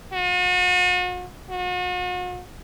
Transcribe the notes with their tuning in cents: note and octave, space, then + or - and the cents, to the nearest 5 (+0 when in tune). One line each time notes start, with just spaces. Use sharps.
F#4 -45
F#4 -40